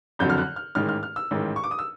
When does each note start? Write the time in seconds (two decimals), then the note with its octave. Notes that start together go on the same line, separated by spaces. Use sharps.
0.19 F#1 F2 D3 F#3 G6
0.30 F6
0.38 F#6
0.56 F6
0.75 A1 G#2 D#3 F6
0.89 F6
1.03 F6
1.16 E6
1.31 A1 G#2 D#3
1.56 C#6
1.64 D6
1.71 D#6
1.79 E6